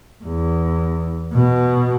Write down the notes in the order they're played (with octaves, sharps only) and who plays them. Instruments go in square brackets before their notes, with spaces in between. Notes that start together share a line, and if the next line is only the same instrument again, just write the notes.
[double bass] E2
B2